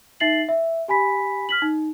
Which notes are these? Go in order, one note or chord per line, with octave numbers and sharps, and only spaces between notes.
D#4 E5 A6 C7 F#7
E5
G4 G#5 B5 B6
F6 B6 F#7
D#4